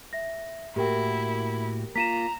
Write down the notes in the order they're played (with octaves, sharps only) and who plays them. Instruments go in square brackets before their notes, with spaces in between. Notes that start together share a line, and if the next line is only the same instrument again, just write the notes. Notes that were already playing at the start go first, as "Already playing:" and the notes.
[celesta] E5 A#6
[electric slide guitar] A2 A#3 F#4 [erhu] E4 [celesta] G4 A#4 G5
[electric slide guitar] A#3 F4 [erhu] A#5 [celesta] B6 D#7 E7